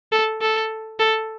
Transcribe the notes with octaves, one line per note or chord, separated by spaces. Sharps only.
A4
A4
A4